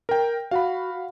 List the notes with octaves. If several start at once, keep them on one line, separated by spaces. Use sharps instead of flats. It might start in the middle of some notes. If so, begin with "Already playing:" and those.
A#4 G5
F#4 F5 F#5 B5